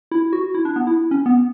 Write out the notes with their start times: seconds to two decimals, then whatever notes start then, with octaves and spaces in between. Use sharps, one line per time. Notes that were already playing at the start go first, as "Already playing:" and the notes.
0.11 E4
0.33 F#4
0.54 E4
0.65 D4
0.76 B3
0.87 E4
1.11 C#4
1.26 B3